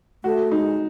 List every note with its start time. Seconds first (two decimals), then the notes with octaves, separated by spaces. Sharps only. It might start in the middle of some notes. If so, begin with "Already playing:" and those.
0.24 A3 F#4
0.52 G#3 D#4